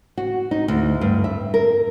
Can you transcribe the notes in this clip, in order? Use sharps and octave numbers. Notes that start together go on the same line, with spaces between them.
F#4
D#4
D2
G2
E5
A#4